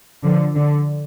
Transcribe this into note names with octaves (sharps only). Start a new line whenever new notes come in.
D3 F3
D3